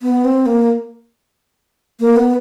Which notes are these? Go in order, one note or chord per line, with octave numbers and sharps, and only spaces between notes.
B3
C4
A#3
A#3
B3